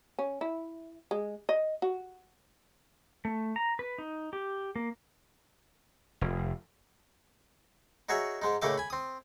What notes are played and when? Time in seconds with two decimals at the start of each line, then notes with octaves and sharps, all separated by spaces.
0.19 C#4
0.41 E4
1.11 G#3
1.49 D#5
1.82 F#4
3.25 A3
3.56 A#5
3.79 B4
3.98 D#4
4.33 G4
4.76 A#3
6.21 F1
8.09 D#4 F#4 G#4 C#5 E5
8.42 G#2 G#3 D#4
8.62 A2 C#3 A#3 D#4 E5 D6
8.78 G#5 B5
8.90 C4 D#6